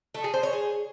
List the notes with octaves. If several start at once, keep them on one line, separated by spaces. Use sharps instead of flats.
A3
G#4
C5
C#5
G#4